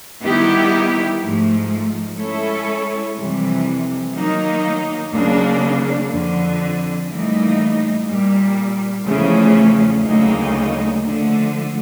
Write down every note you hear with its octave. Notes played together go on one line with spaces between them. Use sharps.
D#3 G3 B3 E4 G4
G#2 F3 A3
G#3 C#4 E4 A4 C#5
F2 C3 E3 G3
D#3 F#3 A#3 D#4
D#2 C#3 F#3 A#3 D4
F2 D3 F3
A2 E3 G3 A#3 D#4
A#2 G3 A#3
E2 C#3 F3 A3 C#4
D2 C#3 F#3 A#3 D#4
D3 F3 A3